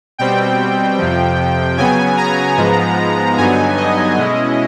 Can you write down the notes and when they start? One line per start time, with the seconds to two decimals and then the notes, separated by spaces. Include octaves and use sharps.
0.18 B2 G3 C4 G5
0.98 F2 C3 F3
1.78 C#3 F#3 B3 G#5
2.17 A#5
2.57 G#2 F3 G#3 B3
3.38 G2 D3 F#3 B3 D#4 G#5
3.77 D#5
4.17 B2 G#3 C#4 E4